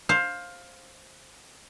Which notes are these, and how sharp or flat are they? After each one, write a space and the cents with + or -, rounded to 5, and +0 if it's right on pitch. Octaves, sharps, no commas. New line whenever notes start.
C5 +15 F5 +15